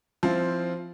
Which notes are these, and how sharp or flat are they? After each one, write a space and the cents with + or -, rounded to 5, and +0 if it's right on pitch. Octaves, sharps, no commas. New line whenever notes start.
F3 -10 C4 +0 E4 +0